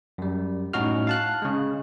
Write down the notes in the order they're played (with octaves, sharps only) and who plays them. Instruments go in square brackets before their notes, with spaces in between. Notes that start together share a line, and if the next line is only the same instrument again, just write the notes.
[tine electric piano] F#2 G3
A2 C#4 D#4 F#4 F6
F5 A5 F#6
C#3 G#3